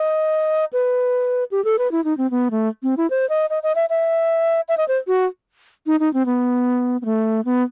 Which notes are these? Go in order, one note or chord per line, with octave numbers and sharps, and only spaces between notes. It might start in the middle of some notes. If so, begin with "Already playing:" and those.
Already playing: D#5
B4
G4
A4
B4
E4
D#4
C4
B3
A3
C4
E4
C5
D#5
D#5
D#5
E5
E5
E5
D#5
C5
F#4
D#4
D#4
C4
B3
B3
A3
B3